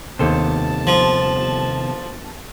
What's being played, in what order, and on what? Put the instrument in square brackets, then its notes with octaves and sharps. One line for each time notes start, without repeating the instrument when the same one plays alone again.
[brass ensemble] G1 A5 [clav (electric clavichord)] D#2 A4 C5 [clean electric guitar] C3 D#3 B3
[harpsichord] F3